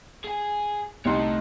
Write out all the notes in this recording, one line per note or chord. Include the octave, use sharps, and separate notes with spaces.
G#4 G#5
C2 A3 D#4 C#5 C6